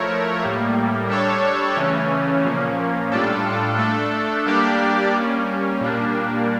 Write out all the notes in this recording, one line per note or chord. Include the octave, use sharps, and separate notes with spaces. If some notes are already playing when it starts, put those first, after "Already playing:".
Already playing: F3 A3 E4 A#4 C#5
A2 G3 A#3
G3 D4 A4 C#5
C#3 E3 A3 C#4
A#2 F3 A#3 C#4
A2 G3 D4 F4 A4
A3 D4 A4
G3 A#3 D4 G4 D5
G3 A#3 C#4
A#2 G3 A#3 D4